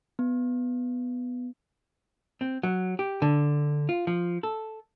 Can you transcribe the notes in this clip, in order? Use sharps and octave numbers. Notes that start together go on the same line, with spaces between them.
B3
C4
F#3
G4
D3
F4
F3
A4